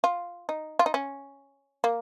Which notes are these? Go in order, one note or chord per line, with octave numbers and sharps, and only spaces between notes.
F4
D#4
F4
D#4
C#4
A#3